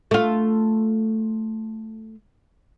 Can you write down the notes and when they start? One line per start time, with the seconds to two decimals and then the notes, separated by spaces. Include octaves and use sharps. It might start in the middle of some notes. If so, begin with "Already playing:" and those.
0.11 A3 F4